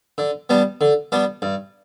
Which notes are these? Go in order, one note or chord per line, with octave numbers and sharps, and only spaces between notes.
D3
G3 B3 D4
D3
G3 B3 D4
G2